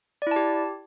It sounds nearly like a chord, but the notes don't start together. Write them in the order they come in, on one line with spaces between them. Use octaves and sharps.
D5 E4 A5 G4